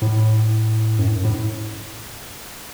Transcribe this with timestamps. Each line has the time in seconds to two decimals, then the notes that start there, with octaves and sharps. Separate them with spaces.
0.02 A2
0.99 F#2
1.08 A2
1.16 F#2
1.25 A2